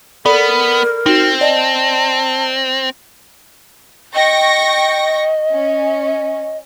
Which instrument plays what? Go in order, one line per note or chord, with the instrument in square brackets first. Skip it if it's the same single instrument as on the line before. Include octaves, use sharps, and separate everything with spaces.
[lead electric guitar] B3 [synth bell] A4 D5 B5 [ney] A#4
[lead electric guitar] C4 [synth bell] D#4 F#4
[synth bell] D5 D#5 [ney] A5
[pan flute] D#5 [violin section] G5 C#6 A#6
[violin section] C#4